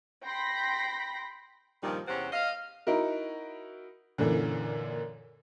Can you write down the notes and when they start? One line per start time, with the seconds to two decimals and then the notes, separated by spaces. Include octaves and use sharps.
0.25 G5 B5 C6 A#6 B6
1.82 G2 A#2 D#3 F3 G3 D#4
2.07 E2 C3 C4 C#4 C5 F#5
2.32 D#5 F5
2.87 D#4 E4 F#4 A#4
4.18 F#2 A#2 D3 E3